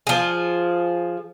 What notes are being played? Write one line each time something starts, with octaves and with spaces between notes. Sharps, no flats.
F3 G#4